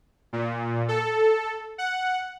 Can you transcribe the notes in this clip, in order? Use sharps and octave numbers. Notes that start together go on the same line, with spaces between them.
A#2
A4
F#5